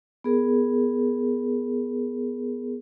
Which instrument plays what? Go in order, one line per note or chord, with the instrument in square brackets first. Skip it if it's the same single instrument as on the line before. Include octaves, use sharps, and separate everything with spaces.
[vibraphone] B3 G#4 A#4